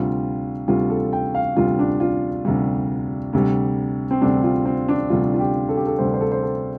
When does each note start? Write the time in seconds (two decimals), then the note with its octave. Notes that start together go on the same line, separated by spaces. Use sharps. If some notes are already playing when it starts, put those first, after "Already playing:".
Already playing: D2 C3 G3 F4
0.68 D2 C3 G3 F4
0.90 A4
1.13 G5
1.35 F5
1.56 D2 C3 G3 F4
1.79 D4
2.00 F4
2.45 D2 C3 G3
3.33 D2 C3 G3
4.11 C4
4.21 D2 C3 G3 D4
4.43 F4
4.65 C4
4.88 D4
5.10 D2 C3 G3 F4
5.34 F4
5.40 G4
5.69 A4
5.77 G4
5.87 A4
5.98 D2 C3 G3 C5
6.14 C5
6.21 A4
6.32 C5
6.43 A4